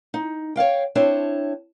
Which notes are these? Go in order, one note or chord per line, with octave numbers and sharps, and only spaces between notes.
D#4
C#5 D5 F5 G5
C4 D4 E4 C5 C#5 A5